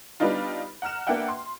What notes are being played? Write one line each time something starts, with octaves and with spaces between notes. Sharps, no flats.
G3 B3 D4 D#4 F4
F#5 A#5 F6 E7
A#3 D4 B4 E5 F#5 G5
C6